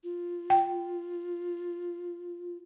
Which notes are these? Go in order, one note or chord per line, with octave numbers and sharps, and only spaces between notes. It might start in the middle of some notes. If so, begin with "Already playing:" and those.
F4
G5